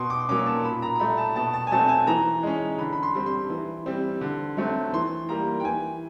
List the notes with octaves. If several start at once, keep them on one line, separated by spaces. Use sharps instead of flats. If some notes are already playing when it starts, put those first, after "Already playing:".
Already playing: B2 C6
D6
F#3 A#3 C#4 D6
A5
A#2 B5
A#5
A#5
F#3 A3 B5
A5
B2 A5
A5
G#5
F#3 A3 C4 A5
G#5
E3 A#5
G#3 C#4
D3 B5
B5
C6
G3 C4
C6
E3
G3 C4
D3
F#3 A3 C4
E3 C6
G3 A#3 A#5
G5
E3 G#5